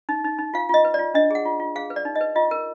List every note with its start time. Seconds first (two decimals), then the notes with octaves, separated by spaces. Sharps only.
0.09 D#4
0.24 D#4
0.38 D#4
0.54 F4 F5
0.69 F4 D#5
0.85 B4
0.94 F4 D5
1.14 D4 D#5
1.31 G#4 F#5
1.45 F4
1.60 F4
1.76 G#4 F5
1.90 B4
1.96 D5
2.05 D#4
2.16 D#5
2.21 B4
2.36 F4 D#5
2.51 A#4